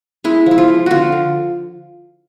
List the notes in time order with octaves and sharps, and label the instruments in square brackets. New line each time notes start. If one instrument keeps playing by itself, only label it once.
[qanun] G#3 E4
F3 E4
F4
F3
D3 F4 F#4
D3